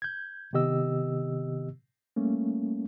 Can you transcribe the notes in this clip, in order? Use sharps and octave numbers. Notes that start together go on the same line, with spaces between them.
G6 G#6
C3 D#3 B3 G4 D#5 E6
G3 A3 A#3 C#4